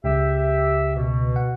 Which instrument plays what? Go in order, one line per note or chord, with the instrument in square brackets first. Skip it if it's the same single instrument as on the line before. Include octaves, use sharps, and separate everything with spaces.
[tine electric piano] C#2 C#3 [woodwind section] G4 E5
[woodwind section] B2
[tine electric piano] F#5